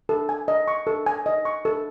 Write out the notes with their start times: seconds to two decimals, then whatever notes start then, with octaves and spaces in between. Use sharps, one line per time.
0.09 A4
0.29 G#5
0.48 D#5
0.68 C#6
0.87 A4
1.06 G#5
1.26 D#5
1.45 C#6
1.65 A4